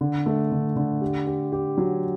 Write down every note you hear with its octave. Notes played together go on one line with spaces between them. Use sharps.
D3
A3
D3
D3
G4
G4
G4
F#3